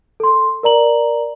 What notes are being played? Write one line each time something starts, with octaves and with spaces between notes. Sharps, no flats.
A4 C6
A#4 D5 A#5 F#7